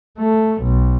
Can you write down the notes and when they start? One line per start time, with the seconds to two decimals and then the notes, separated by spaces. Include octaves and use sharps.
0.18 A3
0.63 B1